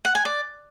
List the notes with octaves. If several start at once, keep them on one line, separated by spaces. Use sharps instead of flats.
F#5
G#5
D5